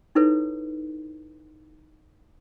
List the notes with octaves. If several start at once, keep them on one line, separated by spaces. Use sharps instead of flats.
D#4 E4 A4 B4 C#5